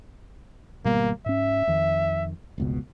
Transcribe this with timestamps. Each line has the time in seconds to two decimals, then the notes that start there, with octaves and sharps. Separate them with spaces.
0.85 G#1 B2 G3 A#3
1.26 G#2 C#4 E5
1.67 F2 D#3
2.58 F1 C#2 B2